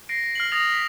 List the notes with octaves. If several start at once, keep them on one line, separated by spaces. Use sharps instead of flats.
A#6 C7 D7
F6 C7 F#7
D#6 A6 A#6 F7
B6